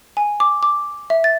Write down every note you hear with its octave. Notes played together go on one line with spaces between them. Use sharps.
G#5
D6
D6
E5
A6